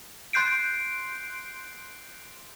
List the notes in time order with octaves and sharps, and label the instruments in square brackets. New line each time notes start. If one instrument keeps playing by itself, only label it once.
[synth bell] C6 F#6 G6 C7 D7